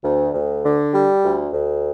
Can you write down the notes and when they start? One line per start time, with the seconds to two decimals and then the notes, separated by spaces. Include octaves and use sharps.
0.04 D2
0.34 D2
0.64 D3
0.94 G3
1.24 D2
1.54 D2